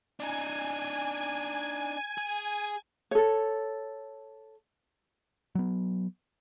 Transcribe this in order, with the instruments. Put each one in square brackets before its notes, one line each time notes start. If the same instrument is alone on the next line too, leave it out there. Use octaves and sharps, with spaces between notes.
[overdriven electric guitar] D4 D#4 [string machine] G#5
[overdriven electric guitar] G#4
[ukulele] A4 C#5
[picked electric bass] F#3 B3